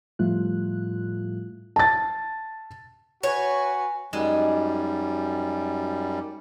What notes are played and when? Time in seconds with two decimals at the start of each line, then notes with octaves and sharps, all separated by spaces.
0.19 A2 F3 G3 A3 F4 F#6
1.76 A5 A6
3.23 F#4 B4 C#5 G#5
4.13 F#2 G3 G#3 D#4 F#4 D#5